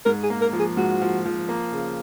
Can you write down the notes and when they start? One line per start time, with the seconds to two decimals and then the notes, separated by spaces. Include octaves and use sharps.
0.06 G#2 A#4
0.23 G#4
0.30 A#3
0.41 A#4
0.53 F3
0.59 G#4
0.77 G#2 F#4
1.02 F3
1.25 F3
1.49 A#3
1.73 C#3